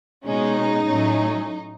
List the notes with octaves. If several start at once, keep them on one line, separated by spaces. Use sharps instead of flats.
B2 G#3 C#4 D#4
A2 F#3 A3 C#4